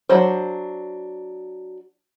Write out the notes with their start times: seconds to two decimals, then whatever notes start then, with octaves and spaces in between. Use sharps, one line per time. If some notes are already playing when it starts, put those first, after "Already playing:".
0.09 F#3 D4 C5